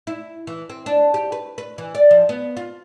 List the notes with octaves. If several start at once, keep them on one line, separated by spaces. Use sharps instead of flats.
E4
E3
C4
D4
G4
B4
B4
E3
D5
F3
B3
F4